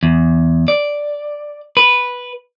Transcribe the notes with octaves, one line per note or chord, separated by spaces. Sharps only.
E2
D5
B4